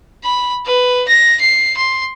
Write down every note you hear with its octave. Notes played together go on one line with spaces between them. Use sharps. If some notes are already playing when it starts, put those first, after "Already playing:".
B5
B4
A#6
C7
C6